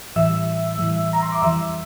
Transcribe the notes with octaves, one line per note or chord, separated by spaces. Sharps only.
A2 E3 G3 E5 E6
A2 E3 G3
A#5
C6
D6
F2 E3 G3 E5 E6